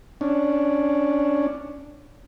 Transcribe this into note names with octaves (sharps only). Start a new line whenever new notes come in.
C#4 D4